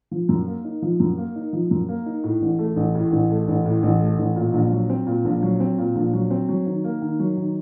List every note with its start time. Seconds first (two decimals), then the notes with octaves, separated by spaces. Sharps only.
0.11 F3
0.29 F#2
0.47 A#3
0.65 D#4
0.82 F3
1.00 F#2
1.17 A#3
1.36 D#4
1.53 F3
1.71 F#2
1.89 A#3
2.06 D#4
2.24 A2
2.42 A1
2.59 A3
2.76 A1
2.95 A2
3.12 A1
3.30 A3
3.48 A1
3.65 A2
3.83 A1
4.01 A3
4.19 A1
4.36 A#2
4.54 A#1
4.72 F#3
4.90 C4
5.07 A#2
5.25 A#1
5.43 F#3
5.60 C4
5.78 A#2
5.96 A#1
6.13 F#3
6.31 C4
6.49 F#3
6.66 D#3
6.84 A#3
7.02 D#3
7.19 F#3
7.37 D#3